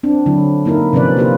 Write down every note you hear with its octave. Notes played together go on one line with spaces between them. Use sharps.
C4 D4
D3 F#3 E4
A#3 D#4 E4 A#4
C3 F3 C#4 B4 D5
A#3 E4 F4 G4 B4